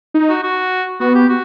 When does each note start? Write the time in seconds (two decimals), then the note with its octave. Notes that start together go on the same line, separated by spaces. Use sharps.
0.14 D#4
0.29 F#4
0.43 F#4
1.00 B3 F#4
1.15 G4
1.29 F#4